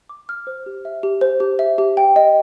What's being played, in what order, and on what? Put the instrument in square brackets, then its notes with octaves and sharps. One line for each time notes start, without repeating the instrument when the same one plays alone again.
[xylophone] D6
F6
C5
G4
E5
G4
C5
G4
E5
G4
G5
D#5